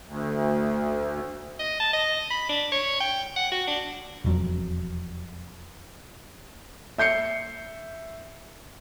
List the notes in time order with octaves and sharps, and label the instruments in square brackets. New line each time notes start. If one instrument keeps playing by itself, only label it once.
[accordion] D2
[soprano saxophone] D#5
A5
D#5
B5
D4
C#5
G5
F#5
F#4
D4
[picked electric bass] E1 F2 F#3
[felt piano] E5 G6 C7 C#7